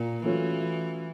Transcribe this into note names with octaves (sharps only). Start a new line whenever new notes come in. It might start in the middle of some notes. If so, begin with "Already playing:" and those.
Already playing: A#2 A#3
E3 F#3 A3 C#4 F4